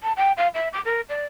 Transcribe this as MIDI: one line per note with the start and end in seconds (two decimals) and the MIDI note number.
0.03 0.13 81
0.17 0.32 79
0.37 0.48 77
0.54 0.69 76
0.73 0.81 86
0.85 1.01 70
1.09 1.25 74